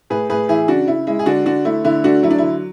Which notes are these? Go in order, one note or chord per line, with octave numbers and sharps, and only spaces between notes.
A2 G#4 B4
A2 G#4 B4
E3 E4 G#4
C#3 D4 F#4
C#3 E4
G#3 E4
G#4
D3 D4 F#4
D3 D4 F#4
A3 E4
D3 E4
A3 D4 F#4
F#3 E4
D4
D3 E4